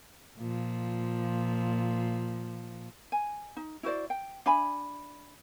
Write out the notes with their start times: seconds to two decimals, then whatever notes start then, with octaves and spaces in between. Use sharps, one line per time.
0.38 A#2 F3
3.12 G#5
3.57 D#4
3.83 E4 F#4 C5 D5
4.10 G5
4.46 D4 E5 G#5 B5